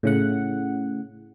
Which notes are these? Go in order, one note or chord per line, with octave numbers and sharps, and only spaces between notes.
A2 C#3 F#5